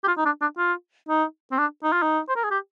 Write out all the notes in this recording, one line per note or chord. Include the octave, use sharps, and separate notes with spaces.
G4
F4
D#4
D4
D4
F4
D#4
C4
D4
D#4
F4
D#4
C5
A#4
G#4
G4